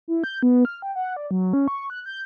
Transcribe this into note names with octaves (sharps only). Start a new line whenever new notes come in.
E4
G6
B3
F6
G5
F#5
D5
F#3
C#4
C#6
F#6
G6